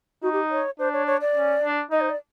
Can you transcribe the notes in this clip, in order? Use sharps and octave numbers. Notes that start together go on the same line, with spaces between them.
D#4 F#4
G4
C#5
D4 C5
C#5
C#5
D5
C#4
D4
D#4 D#5
C5
D5